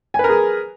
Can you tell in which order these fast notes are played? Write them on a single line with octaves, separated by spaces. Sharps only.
G#5 B4 A#4 G#4